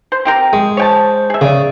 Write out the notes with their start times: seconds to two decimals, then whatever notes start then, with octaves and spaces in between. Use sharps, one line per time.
0.12 C5
0.25 C4 G4 A#4
0.53 G#3
0.77 C5 C#5 G5 A5
1.30 G#4 E5
1.41 C#3 D5